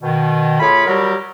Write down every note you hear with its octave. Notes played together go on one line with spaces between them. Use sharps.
B2 D#3
A3 F4 G#4 C#5 B5
F#3 G3 F#4 G4 A#4